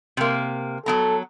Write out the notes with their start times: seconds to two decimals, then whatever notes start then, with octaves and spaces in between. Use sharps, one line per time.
0.17 C3 A#3
0.86 F#3 B3 A4 A#5